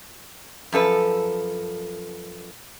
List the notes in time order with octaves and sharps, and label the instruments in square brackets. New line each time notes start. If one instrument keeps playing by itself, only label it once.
[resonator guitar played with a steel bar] F#2 F3 A4 B4